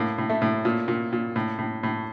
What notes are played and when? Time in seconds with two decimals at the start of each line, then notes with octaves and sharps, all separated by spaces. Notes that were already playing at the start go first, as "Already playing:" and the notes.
Already playing: A2 A#3
0.18 A2
0.29 A3
0.42 A2
0.65 A#2
0.88 A#2
1.13 A#2
1.36 A2
1.58 A2
1.83 A2